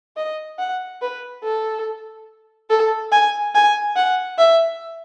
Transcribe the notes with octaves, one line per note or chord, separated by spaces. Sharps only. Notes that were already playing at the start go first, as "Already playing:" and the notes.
D#5
F#5
B4
A4
A4
G#5
G#5
F#5
E5